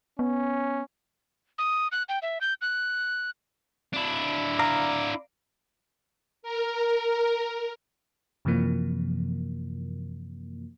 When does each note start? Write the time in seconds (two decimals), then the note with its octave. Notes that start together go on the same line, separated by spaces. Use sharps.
0.19 B3 C#4
1.58 D#6
1.92 F#6
2.09 G5
2.22 E5
2.41 G6
2.61 F#6
3.93 D4 E4
4.59 D5 F5 A#5
6.43 A#4
8.45 F#2 C3 E3 F3 A#3